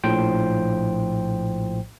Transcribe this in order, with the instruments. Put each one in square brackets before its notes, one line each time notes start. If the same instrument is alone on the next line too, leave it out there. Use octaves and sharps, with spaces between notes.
[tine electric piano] A#1 A2 F3 C5 G5